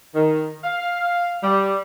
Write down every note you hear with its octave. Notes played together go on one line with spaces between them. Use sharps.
D#3
F5
G3